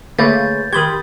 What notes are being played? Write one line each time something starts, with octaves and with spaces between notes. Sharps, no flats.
D3 A3 A#3 G#4 B4 C#5 G6 A6
D#3 G4 B5 C6 D#6 G#6